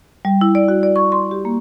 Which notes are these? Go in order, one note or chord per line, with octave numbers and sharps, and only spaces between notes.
G3
E4
D5
F#4
D5
C#6
C6
G4
A#3